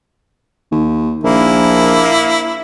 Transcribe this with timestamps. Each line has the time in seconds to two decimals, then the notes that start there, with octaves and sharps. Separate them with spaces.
0.72 D#2
1.24 A#1 A#3 E4